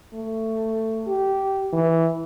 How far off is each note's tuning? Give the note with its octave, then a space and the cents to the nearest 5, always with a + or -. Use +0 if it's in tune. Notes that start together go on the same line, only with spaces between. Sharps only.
A3 +15
G4 -15
E3 -5